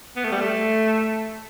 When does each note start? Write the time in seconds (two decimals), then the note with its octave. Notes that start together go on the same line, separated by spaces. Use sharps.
0.16 B3
0.25 A3
0.32 G3
0.40 A3